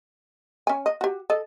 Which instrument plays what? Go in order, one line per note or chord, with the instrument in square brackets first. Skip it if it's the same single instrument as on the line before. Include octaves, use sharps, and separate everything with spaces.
[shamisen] C#4 G#5
D#5
F#4 G4
A4 D#5